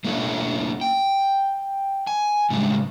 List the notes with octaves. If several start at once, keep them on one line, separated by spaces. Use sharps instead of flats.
A3 A#3 C#4 D4 E4 A4
G5
G#5
A2 C#3 G3 G#3